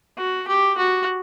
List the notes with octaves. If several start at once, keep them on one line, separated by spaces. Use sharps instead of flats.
F#4
G4
F#4